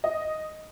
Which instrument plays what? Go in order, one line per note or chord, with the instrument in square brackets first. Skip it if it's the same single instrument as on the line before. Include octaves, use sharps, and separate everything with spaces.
[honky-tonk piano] D#5